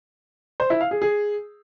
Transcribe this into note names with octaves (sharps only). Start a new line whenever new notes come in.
C5
E4
F5
G#4
G#4